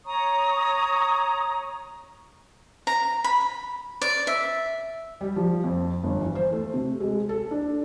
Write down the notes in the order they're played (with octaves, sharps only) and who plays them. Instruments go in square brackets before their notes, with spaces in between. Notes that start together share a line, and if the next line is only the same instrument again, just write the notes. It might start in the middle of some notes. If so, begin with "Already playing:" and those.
[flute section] C#5 A#5 C#6 D#6
[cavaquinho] A#5
B5
D5
E5
[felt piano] G3
F3
F2
G1
E3
C5
A3
C3
G#3
A4
D4